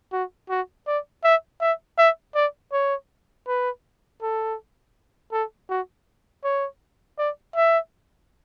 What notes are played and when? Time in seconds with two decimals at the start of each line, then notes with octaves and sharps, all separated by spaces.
0.12 F#4
0.50 F#4
0.87 D5
1.24 E5
1.61 E5
1.98 E5
2.35 D5
2.73 C#5
3.48 B4
4.22 A4
5.32 A4
5.70 F#4
6.44 C#5
7.19 D5
7.56 E5